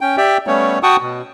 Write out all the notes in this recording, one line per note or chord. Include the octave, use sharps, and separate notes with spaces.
C#4 G5
G4 D5 E5 G5
G3 A3 B3 C#4 C#5
F#4 F#5 G5 A5 C#6 D#6
B2